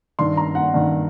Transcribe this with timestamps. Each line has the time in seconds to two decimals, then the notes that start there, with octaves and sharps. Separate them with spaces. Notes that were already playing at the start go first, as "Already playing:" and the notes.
0.19 G2 D#3 C6
0.37 A#5
0.55 F#5
0.74 G2 D#3